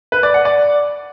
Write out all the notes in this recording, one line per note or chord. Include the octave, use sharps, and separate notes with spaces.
B4
D5
F#5
D5